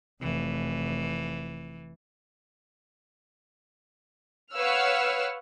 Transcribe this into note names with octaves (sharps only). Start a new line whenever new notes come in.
F1 E3
B4 C#5 F5 F#5 E6 F6